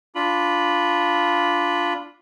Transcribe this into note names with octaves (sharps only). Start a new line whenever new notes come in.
D4 F4 B5